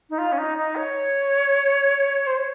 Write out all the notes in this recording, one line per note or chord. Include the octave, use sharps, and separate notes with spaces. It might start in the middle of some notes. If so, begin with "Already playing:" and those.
D#4
F4
C#4
D#4
D#4
C#5
C5
C#5